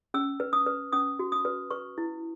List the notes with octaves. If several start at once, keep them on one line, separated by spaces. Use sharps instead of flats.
C#4 E6
B4
D#6
B4
C#4 D#6
F#4
D#6
B4
B4 C#6
E4